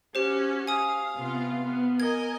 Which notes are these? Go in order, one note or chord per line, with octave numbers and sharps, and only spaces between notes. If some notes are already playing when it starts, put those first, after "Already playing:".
C#4 F#4 G4 C5
F5 G#5 D#6
C3 B3 F4
B3
A#4 D#5 G#5 G#6